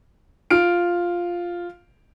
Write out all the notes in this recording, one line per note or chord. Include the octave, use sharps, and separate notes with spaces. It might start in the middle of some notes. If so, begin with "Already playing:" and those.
F4 F6 D7